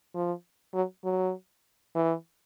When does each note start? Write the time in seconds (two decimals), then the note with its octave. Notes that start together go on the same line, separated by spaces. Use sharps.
0.15 F3
0.74 F#3
1.04 F#3
1.95 E3